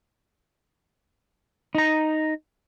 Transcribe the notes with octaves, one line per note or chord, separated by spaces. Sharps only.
D#4 A#5